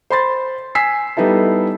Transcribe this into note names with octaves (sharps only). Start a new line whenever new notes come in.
C5 B5 C6 A6
G#5 E6 B6 C7
G3 B3 D#4 E4 A4